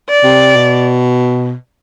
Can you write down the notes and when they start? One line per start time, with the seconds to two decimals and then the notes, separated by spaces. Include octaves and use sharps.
0.09 D5
0.24 C3
0.56 B2